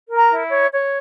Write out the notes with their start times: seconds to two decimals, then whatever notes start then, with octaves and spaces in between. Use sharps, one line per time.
0.08 A#4
0.15 A#5
0.30 E4
0.50 C#5
0.71 C#5